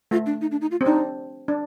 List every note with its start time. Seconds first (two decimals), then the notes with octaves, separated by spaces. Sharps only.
0.11 A3 F4
0.26 D4
0.41 D#4
0.51 D4
0.61 D#4
0.71 F4
0.81 C4
0.85 D4 D#4
1.48 D4